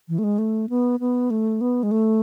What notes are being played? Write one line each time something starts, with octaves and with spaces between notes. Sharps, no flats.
E3
A3
G#3
A3
B3
B3
A3
B3
G#3
A3